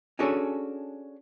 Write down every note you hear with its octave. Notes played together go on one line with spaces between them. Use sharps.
C#4 D4 F#4 G#4 A4 C#5